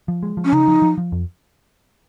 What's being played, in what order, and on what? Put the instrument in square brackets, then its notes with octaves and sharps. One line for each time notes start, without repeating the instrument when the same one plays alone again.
[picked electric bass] F3
G#3
F3
[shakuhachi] C#4
[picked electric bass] C#3 [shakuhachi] D#4
[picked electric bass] F3
F3
F3
F2